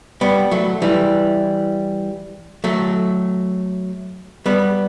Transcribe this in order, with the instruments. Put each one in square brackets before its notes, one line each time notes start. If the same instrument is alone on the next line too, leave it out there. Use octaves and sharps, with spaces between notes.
[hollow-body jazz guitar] G3 B3
F#3 A3
E3 G3
F#3 A3
G3 B3